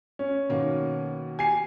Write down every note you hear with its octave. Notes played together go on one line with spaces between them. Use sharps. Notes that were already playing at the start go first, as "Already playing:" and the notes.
C#4
B2 D#3 A#3
G4 G#5 C7